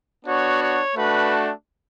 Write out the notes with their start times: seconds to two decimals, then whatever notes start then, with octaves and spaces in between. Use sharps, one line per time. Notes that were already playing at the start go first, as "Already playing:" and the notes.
0.25 B3 D4 F#4 C#5
0.61 C#5
0.95 A3 D4 F#4 B4